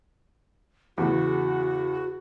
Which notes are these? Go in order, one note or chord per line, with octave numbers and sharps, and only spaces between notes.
E2 C#3 F#4